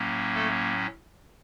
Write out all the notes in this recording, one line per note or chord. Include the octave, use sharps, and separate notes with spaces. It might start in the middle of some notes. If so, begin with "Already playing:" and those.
Already playing: A2 F#3 A#3 C#4
A3 A4